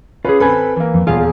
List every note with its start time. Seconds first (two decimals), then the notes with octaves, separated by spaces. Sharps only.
0.25 C#4 F4 G#4 B4
0.40 C4 A4 B4 G#5 B5
0.76 E3 A#3
0.94 F2
1.07 D#1 E2 F4 G#4 F5